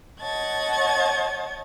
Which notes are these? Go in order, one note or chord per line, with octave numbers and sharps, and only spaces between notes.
C#5 D#5 F#5 A5 G#6 A6